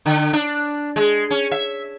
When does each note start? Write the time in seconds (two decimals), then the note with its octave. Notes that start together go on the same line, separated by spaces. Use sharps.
0.06 D3
0.33 D4
0.96 G#3
1.30 C#4
1.51 E5